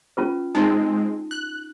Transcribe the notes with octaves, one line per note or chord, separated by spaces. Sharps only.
C#4 F4 B4
G#3 C4 D#4
F#6